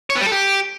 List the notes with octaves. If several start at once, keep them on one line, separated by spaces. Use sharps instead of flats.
C#5
B3
G3
A4
G4